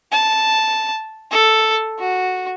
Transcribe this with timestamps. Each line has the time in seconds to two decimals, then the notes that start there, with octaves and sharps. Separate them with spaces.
0.12 A5
1.31 A4
1.99 F#4